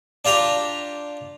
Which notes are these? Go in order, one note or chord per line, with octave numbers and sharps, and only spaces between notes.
D4 F4 G4 A#5